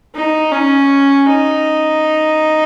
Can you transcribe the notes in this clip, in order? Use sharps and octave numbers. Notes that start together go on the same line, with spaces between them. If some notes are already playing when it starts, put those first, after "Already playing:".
D#4
C#4
D#4